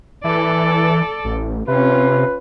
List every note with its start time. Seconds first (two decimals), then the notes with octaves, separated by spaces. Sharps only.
0.24 E3 A4 D5
1.25 A1
1.68 C3 C#4 F4 B4